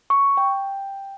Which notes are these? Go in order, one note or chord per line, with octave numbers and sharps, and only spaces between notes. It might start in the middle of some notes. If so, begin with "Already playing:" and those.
C#6
G5